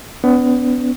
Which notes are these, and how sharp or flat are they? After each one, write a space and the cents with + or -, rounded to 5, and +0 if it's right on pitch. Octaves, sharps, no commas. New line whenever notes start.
B3 +20 D4 -35